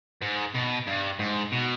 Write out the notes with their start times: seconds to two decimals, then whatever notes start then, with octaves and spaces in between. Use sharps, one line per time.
0.22 G#2
0.55 B2
0.87 G2
1.19 G#2
1.52 B2